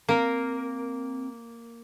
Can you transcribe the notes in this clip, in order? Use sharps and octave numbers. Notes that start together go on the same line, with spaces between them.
A#3 C4 A#4